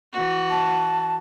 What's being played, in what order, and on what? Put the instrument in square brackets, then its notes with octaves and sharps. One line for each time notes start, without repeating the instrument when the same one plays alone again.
[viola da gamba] E3 F#4
[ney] A5